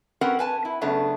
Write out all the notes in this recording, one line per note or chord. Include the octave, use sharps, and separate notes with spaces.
C4 C#4 F#4 A#4 B4 F#5
B4 G#5 A5
E4
F#2 C#3 A3 B3 D4